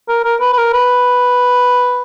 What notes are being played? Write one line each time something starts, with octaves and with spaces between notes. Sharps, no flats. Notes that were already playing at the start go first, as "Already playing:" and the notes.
A#4
A#4
B4
B4
A#4
B4